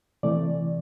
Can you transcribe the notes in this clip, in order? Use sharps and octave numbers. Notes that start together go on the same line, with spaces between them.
C3 E3 A3 D5